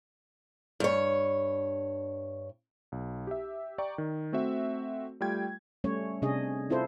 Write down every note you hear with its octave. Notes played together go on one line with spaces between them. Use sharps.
G2 C#5
B1
G4 E5
D5 G5 A#5 C#6
D#3
A3 C4 F#4 E5
G3 A3 F4 G5 G#6
G3 A3 C#4 C#5
C3 C#4 D4 G#4 D#5
C4 E4 F4 A4 C5